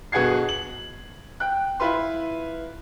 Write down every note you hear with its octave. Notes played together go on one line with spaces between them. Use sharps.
G1 B2 G#4 F#5 G#6 C7
F#7
G5 F#6
E4 F4 B4 C6